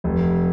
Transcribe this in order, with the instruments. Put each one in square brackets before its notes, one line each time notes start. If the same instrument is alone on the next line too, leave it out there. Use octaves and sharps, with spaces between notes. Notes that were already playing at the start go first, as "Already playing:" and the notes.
[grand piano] F1 [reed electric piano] F3